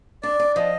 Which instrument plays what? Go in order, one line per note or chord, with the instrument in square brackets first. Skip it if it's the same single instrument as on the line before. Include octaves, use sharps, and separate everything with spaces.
[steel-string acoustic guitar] D4 [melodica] D5
[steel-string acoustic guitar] D4
[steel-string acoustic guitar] F3 [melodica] D#5